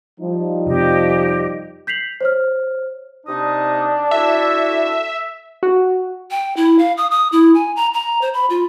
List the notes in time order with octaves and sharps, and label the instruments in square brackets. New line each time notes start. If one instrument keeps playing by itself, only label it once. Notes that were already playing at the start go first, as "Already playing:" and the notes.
[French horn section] F3 G3 D#4
[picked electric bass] F1 C3 [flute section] G4 D#5
[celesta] G6 B6 C7 F7 F#7
C5 C#5 F6
[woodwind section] C3 D#4 D#6 [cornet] D4
[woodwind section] E4 F#4 A4 [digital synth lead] E5
[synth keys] F#4
[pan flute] G5
E4
F5
D#6
D#6
E4
G#5
A#5
A#5
C5
B5
F4